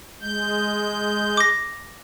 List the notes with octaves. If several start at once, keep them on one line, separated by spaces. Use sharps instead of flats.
G#3 G6
D6 A#6